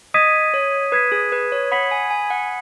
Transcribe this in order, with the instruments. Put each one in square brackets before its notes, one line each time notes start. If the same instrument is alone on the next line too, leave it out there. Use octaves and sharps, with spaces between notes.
[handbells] D#5 [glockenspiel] D#6 G#6 B6 D#7
[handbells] C#5
[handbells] B4 [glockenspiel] D#6 G#6 B6 D#7
[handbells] G#4
B4
C#5
[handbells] F#5 [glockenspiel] B5 D#6 B6 F#7
[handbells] G#5
G#5
F#5